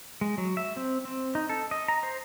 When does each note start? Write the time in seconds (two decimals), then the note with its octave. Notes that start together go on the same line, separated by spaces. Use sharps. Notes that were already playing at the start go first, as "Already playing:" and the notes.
0.21 G#3
0.38 F#3
0.57 E5
0.76 C4
1.05 C4
1.35 D#4
1.50 A4
1.71 D#5
1.88 A#5
2.03 C5